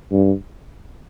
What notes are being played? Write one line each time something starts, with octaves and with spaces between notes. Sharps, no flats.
G2